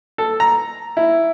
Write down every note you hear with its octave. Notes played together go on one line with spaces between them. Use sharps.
A4
A#5
E4